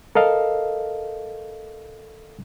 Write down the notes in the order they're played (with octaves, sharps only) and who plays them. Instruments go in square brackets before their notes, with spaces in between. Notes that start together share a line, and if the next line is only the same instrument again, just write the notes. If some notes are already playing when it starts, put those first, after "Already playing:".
[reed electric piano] A4 A#4 D#5 F5